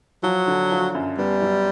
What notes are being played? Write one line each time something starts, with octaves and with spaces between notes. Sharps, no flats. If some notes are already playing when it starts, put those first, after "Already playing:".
F3 F#3
D3
F3
F#2
G3 B3
F#3